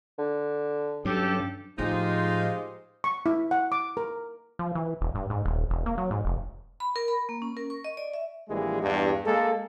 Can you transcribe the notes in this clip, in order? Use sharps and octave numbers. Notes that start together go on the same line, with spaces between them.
D3
G2 F#3 C#4 G4 A4
A2 F3 G#3 D#4 F4 G4 G#4 C5
C#6
E4
F#5
D6
A#4
F3
E3
E1
G2
G#2
D#1
E1
A#3
F#3
G#2
F1
B5
A#4
B5
A#3
C#4
A#4
C#6
D#5
D5
E5
A#1 E3 G3 G#3
E2 G2
G#3 A#3 A4